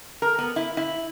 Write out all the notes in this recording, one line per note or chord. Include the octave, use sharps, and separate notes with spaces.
A#4
B3
E4
E4